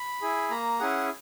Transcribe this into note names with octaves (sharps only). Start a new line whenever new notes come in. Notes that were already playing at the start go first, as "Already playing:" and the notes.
Already playing: B5
E4 G#4
A#3 A#5
C#4 E4 G#4 F#5